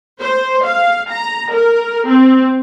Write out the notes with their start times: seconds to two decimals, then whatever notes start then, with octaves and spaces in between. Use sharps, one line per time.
0.20 C5
0.65 F5
1.10 A#5
1.53 A#4
2.07 C4